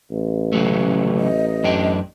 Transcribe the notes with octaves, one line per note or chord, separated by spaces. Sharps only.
A1
C#3 F#3 A3
D#5
F#2 D4 G5